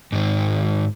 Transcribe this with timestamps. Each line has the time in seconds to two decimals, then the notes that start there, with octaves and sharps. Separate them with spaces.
0.12 G#2 D#3